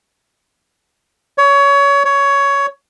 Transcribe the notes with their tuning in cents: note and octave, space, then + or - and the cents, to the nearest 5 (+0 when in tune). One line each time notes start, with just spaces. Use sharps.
C#5 +25
C#5 +15